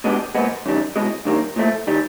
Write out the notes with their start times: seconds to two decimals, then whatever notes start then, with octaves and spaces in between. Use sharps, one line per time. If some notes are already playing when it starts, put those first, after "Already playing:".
0.04 B2 G#3 B3 D4 G4
0.35 A#2 F3 G#3 B3
0.66 F#2 D#3 G3
0.96 C2 B2 G#3
1.25 G2 D#3 G3 A#3 C#4
1.56 A#2 F3 A3
1.87 D#3 G3